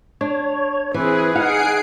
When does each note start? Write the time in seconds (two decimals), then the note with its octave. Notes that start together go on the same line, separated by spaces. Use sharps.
0.21 D4 C#5
0.94 E3 C4 G#4 B4
1.36 D#4 G#4 F5 F#5 C7 D7